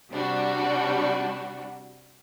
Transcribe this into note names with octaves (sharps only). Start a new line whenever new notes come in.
C3 G3 D4 F#4